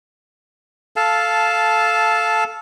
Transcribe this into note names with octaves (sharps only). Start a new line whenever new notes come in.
A4 F5 A5